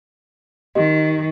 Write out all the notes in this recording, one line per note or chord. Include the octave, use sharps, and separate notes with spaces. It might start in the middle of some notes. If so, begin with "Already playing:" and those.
D#3 G4 D#5